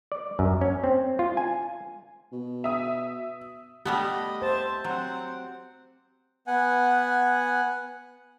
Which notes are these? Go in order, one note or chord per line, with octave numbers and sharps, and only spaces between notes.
D5
F#2
C#4
C4
F4
G#5
B2
E5 D#6
G3 A3 B3 G4 D#5 B5
C5 E5 A5
F#3 C4 F#5
B3 F#5 G#5